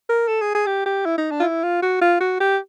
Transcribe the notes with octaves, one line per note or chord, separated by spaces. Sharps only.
A#4
A4
G#4
G#4
G4
G4
E4
D#4
D4
F4
E4
F4
F#4
F4
F#4
G4